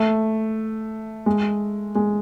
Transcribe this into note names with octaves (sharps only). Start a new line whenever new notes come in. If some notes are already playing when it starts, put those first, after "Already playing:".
Already playing: A3
G#3
G#3